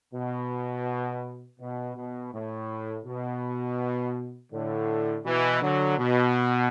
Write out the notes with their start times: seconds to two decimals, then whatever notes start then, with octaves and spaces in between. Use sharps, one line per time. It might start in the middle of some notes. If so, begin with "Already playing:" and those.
0.14 B2
1.60 B2
1.96 B2
2.33 A2
3.06 B2
4.52 A2 D3
5.25 B2 E3
5.62 D3 F#3
5.98 B2